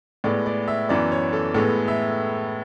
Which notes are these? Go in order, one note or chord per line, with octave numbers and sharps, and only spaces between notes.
A2 G#3 B3 D5
D5
E5
F#2 E3 B3 D5
C#5
A4
A2 G#3 B3 A4
E5